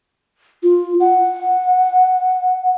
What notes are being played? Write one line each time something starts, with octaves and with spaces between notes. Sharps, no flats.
F4
F#5